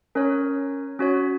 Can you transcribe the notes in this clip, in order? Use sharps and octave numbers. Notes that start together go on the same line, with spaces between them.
C#4 A#4 C#5
C#4 F#4 C#5